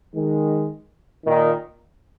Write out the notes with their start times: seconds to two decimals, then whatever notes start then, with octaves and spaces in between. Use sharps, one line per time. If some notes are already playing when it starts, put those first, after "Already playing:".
0.15 D#3 G#3
1.26 A#2 D#3